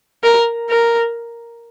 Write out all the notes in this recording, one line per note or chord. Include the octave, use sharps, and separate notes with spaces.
A#4
A#4